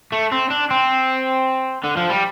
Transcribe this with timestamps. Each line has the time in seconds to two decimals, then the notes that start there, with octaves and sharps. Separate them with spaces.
0.12 A3
0.32 C4
0.51 D4
0.71 C4
1.84 D3
1.97 F3
2.10 G3